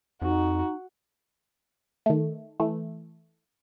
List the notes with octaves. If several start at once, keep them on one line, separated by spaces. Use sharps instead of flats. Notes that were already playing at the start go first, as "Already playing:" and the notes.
F2 D#4 F#4
D#3 A3
E3 A3